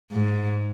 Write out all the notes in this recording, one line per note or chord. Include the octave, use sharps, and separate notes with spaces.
G#2